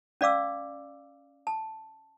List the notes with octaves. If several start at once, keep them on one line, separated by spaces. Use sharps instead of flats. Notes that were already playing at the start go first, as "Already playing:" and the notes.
C#4 D5 F5 D6 E6
A5